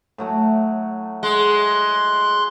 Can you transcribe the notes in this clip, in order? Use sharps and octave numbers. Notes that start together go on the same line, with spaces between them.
A2 F#3 A3
G#3 C6 F#6